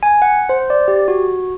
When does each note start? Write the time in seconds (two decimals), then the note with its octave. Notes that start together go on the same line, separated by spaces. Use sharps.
0.03 G#5
0.22 F#5
0.49 C5
0.70 D5
0.88 G4
1.08 F#4